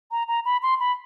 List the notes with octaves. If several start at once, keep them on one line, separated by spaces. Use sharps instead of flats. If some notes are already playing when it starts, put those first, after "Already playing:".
A#5
A#5
B5
C6
B5